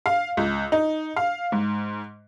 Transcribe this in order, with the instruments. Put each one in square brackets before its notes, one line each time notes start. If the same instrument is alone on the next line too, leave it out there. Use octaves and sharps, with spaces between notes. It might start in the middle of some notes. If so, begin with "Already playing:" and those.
[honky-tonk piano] F5
C#2
D#4
F5
G#2